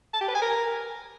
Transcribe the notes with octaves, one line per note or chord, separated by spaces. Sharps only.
A5
G4
B4
G#5
A#4